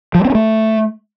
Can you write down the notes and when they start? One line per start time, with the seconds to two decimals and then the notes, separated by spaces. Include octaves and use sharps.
0.15 F3
0.20 G3
0.25 C4
0.30 C#4
0.35 A3